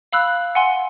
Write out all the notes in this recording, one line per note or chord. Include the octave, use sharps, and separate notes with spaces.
F5 B5 E6 F#6
F#5 G#5 C6